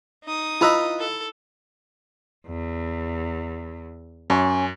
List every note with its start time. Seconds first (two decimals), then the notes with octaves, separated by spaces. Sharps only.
0.24 D#4 D#6
0.61 E4 F4 B4 D#5 B5 E6
0.99 A4
2.47 E2
4.30 F#2 C#4